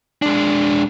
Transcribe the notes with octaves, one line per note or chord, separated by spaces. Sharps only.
G#3 D4